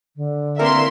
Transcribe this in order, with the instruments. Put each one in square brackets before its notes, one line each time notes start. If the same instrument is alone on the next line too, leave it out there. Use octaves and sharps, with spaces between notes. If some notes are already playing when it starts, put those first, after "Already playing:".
[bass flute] D3
[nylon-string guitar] E3 A#3 C4 [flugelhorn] A#4 [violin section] E5 C6